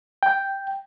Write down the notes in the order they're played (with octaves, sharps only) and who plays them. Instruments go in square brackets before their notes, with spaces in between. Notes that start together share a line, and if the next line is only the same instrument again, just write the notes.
[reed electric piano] G5